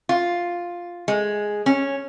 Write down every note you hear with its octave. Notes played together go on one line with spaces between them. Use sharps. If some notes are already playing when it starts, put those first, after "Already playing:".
F4
G#3
C#4